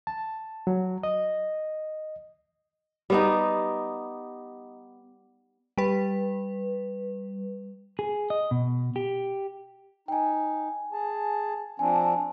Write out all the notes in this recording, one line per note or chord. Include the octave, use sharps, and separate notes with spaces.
A5
F#3
D#5
G3 B3 D#4
G3 B4
G#4
D#5
B2
G4
D#4 G5 G#5
G#4 A5
F3 C4 D4 G#5